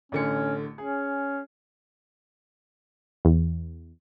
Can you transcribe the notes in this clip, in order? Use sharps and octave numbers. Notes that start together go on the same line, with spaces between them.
A1 D3 C#4 C#7
C#4 G#4
E2